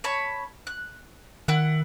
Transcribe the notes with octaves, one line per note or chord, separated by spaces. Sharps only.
C#5 A5 B5
F#6
D#3 E4 F#5